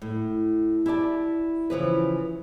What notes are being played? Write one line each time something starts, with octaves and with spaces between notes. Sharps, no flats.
A2
E4 G4 D5 A5
C#3 E3 F3 B4